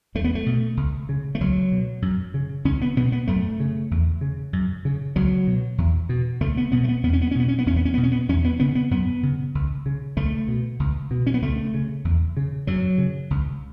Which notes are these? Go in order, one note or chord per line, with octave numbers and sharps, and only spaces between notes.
E2 A3
B3
A3
B2
C#2
C#3
A3
C#2 F#3
B2
F#2
C#3
C#2 C#4
B3
B2 B3
B3
F#2 A3
C#3
E2
C#3
F#2
C#3
C#2 F#3
B2
E2
B2
C#2 A3
B3
B2 B3
A3
B3
E2 B3
C#4
B3
C#4
B2 B3
C#4
B3
E2 C#4
B3
C#4
B2 B3
C#4
B3
E2 C#4
B3
C#3 B3
B3
F#2 B3
C#3
C#2
C#3
C#2 A3
B2
C#2
B2
C#4
B3
C#2 A3
C#3
E2
C#3
F#2 F#3
C#3
C#2